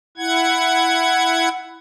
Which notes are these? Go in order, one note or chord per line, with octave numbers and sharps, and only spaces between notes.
E4 F#5 G#6